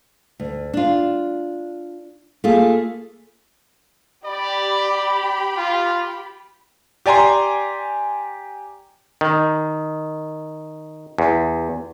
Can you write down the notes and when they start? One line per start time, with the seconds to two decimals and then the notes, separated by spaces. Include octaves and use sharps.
0.40 D2
0.74 D4 F4
2.44 A3 A#3 F4 G#4
4.26 G4 D5 B5
5.58 F4
7.06 G4 D5 G#5 A#5 C6
9.21 D#3
11.18 E2